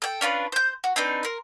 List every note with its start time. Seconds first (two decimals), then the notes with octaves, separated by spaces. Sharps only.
0.02 A4 G5
0.21 C#4 D4 F4 B4
0.52 C5 G6
0.84 F#4
0.96 C4 D4 D#4 B4
1.23 A#4 C6